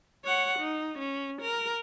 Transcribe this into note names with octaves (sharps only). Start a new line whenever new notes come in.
C#5 F#5
D#4
C#4
A#4